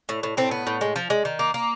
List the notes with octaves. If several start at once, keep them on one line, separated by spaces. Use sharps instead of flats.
A2
A2
A2 C4
B3
A2
G#3
F3
G#3
D#3
A#3
A#3